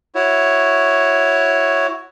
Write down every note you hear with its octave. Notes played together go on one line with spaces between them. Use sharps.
E4 F#4 C#5